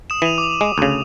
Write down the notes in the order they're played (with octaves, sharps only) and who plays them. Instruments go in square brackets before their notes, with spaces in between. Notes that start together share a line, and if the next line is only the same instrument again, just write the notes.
[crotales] D#6 E7
[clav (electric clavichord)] E3 [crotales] D#7 F7
[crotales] D6
[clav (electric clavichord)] G#3
D2 C#3